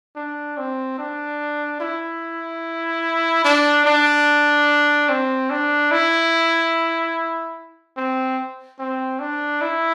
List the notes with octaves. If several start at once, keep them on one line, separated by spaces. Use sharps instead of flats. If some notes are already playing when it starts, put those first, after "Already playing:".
D4
C4
D4
E4
D4
D4
C4
D4
E4
C4
C4
D4
E4